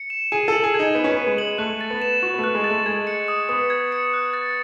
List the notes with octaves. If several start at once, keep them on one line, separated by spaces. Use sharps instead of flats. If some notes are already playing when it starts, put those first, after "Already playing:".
Already playing: C#7
E7
G#4 D#7
A4 F#7
G#4
G#6
D#4
B3 G#6
C#4
B3
D#7
G#3
F#7
A3 F#6
A6
B3
E7
F#4 C#6
B3
A3
F#6
G#3
A6
A3
G#3 G#6
C#7
D#6
B3 D#6
G#6
C#7
F#6
A6